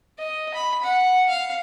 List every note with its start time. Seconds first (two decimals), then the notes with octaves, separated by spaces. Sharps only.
0.19 D#5
0.54 B5
0.84 F#5
1.30 F5